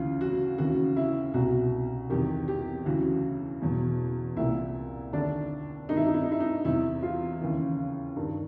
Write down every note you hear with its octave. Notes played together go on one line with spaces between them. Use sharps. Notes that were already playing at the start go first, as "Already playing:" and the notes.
Already playing: D2 C#3 E3 F4
F#4
D#2 C#3 E3 F#4
E4
C2 B2 F#4
E2 C3 D#3 G4
G4
D2 C#3 E3 F#4
E2 B2
C2 A#2 E4
D#2 D3 D4
G2 D#3 D#4
E4
D#4
E4
D#4
E4
D#4
E2 C3 E3 E4
F4
D#2 C#3 E3
G2 D#3